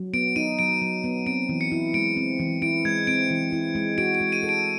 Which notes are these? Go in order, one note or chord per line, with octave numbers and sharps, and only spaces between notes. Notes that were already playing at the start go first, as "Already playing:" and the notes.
Already playing: F#3
B3 D7
D#4 D#7
F#3 D7
F#3
B3
C4 D7
E3
C#7
E4
G#3 D7
C4
E3
E4 D7
G#3 G#6
C4 D7
E3
E4
G#3
F#4 D7
D7
G#3
D#7
A4
D7